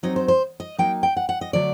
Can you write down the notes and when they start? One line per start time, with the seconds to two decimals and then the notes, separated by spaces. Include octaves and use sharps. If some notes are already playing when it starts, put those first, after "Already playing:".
0.03 F#3 C4 D#4 D#5
0.16 C5
0.28 C5
0.60 D#5
0.78 F#3 A#3 D#4 G5
1.03 G5
1.17 F#5
1.29 F#5
1.41 D#5
1.53 D3 F#3 A3 D4 D5